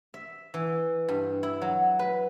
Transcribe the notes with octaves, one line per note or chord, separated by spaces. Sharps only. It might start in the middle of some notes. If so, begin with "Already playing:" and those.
E5
E3
G2
E4
F#3
B4